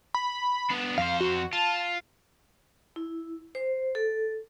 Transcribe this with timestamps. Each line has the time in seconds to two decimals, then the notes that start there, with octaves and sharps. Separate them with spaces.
0.14 B5
0.70 B3 D4
0.98 F2 C5 F5
1.20 F#4
1.53 F4 A5
2.96 E4
3.55 C5
3.95 A4